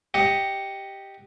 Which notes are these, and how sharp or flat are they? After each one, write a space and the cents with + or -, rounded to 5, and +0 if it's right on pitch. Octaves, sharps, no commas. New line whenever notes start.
G4 +0 D#5 +0 F#5 +5